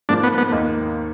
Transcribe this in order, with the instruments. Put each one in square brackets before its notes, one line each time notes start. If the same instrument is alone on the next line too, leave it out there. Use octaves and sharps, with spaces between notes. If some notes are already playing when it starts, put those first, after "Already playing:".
[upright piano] G#2 F3 A#3 [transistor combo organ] D4
[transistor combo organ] B3
B3
[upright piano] D#2 D#3 A#3 D#4